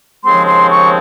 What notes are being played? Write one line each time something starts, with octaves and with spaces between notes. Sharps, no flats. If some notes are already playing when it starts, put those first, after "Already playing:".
D#2 C#3 F3 G#3 C4 C6
C6
C#6